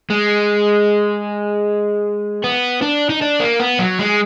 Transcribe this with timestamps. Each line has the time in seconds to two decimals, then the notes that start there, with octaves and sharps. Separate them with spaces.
0.10 G#3
2.44 B3
2.82 D4
3.09 D#4
3.21 D4
3.40 A#3
3.60 B3
3.79 F#3
3.99 G#3